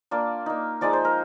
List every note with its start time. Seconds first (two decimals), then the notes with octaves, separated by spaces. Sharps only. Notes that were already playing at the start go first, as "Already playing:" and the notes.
0.11 A#3 D4 F4 D5
0.46 A#3 D#4
0.81 F3 G#3 D#4 D5
0.93 C5
1.05 A#4